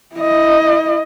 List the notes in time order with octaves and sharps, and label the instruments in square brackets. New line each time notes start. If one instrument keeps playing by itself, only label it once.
[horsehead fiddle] E4 D#5